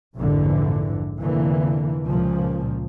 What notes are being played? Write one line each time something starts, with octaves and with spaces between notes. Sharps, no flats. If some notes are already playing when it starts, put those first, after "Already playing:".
A#1 F2 G#2 D3 E3
F1 D3 E3 A#3
C#2 A#2 F3